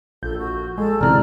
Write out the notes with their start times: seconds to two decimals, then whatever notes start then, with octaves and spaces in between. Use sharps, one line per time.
0.23 A#1 A4 G6
0.38 F#4
0.78 G#3 A4
1.01 D1 C3 E3 D5 A#5 F6